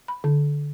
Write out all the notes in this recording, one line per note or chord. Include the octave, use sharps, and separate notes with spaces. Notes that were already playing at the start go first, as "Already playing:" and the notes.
B5
D3